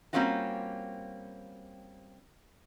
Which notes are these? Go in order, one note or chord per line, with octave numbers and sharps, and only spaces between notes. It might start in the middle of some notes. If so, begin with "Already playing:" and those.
G3 A#3 C4 C#4 F4 F#4